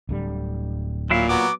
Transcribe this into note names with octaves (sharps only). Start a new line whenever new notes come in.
D1 D3 G3
A#2 F#3 E4 F5
F#3 B3 D6